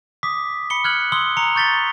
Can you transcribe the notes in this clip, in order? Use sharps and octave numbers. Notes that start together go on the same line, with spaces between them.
D6 D#6 B6
B5 C#7 G7
F6 F#6 G#6 F#7
C6 D#6 E6 G7
A#5 C#7 F7
C#6 G6 A6 B6 G7